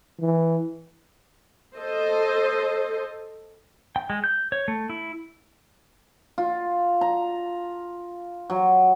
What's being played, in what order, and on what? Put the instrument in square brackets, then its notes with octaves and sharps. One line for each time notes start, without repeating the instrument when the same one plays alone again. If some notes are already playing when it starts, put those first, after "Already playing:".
[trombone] E3
[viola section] A4 C5 D#5
[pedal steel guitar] G5
G#3
G6
C#5
A3
E4
[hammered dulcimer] F4
A#5
F#3